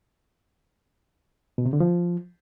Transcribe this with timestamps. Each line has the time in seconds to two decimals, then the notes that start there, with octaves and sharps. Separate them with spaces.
1.58 B2
1.66 C3
1.73 D3
1.80 F3